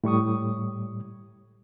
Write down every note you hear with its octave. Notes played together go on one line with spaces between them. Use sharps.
A2 G3 C#6 D#6